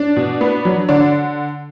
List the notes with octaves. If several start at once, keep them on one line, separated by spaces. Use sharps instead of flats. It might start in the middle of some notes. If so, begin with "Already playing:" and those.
Already playing: D4
B2
B3
F#3
D3 D4